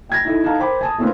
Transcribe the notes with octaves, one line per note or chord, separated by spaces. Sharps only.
G5 G#6 A#6
D#4 E4 A4
D#4 A4 F5 F#5 A5 A#5
A#4 C5 G5 B5 D6
G#5 A5 D#6
A3 A#3 C4 D4 F4 B4